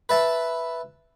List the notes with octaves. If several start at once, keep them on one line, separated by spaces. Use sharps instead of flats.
B4 E5 A5